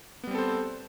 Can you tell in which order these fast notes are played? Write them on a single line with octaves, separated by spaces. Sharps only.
B3 G3 C4 A4 C5